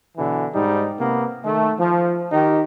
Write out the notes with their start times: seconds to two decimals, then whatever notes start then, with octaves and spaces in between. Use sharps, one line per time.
0.17 B2 D3 E3
0.54 G#2 G3 D#4
1.00 C3 A#3 B3
1.43 D#3 A3
1.79 F3
2.32 D#3 D#4 G4